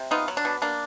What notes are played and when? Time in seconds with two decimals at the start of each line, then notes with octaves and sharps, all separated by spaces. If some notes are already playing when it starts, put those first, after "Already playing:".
Already playing: C3
0.11 B3 D#4 F4
0.28 F#3
0.37 D4
0.45 B2
0.62 A#3 D4